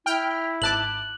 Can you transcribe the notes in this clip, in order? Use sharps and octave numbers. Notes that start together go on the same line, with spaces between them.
E4 G5 F6
G#1 A5 D6 F#6 F#7